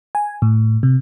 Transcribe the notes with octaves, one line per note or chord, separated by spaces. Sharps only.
G#5
A2
C3